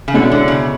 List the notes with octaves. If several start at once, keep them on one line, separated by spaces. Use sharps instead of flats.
C#3
B2 D3 G#3 C#4 E4
D3
C#3